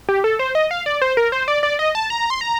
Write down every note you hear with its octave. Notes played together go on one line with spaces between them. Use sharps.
G4
A4
C5
D#5
F5
D5
C5
A#4
C5
D5
D5
D#5
A5
A#5
C6
A#5